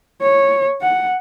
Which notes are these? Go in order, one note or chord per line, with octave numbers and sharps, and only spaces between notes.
C#5
F#5